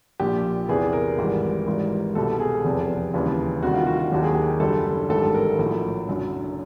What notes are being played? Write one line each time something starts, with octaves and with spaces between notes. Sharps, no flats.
A#1 A#2 F3 G4
E2 C3 E3 G#4
A#4
G#1 G#2 E3 G3
G#1 G#2 E3 G3
C2 B2 G3 A4
G#4
F1 E2 C3
D#2 C#3 E3 G3
D2 C3 D#3 G3 F#4
F4
F#4
F#4
D#2 D#3 F#3 G4
G#4
G4
F#1 F#2 D3 G3 A4
A1 G#2 D#3 G3 A4
A#4
A#1 A2 F#3
F#1 F#2 D3 F#3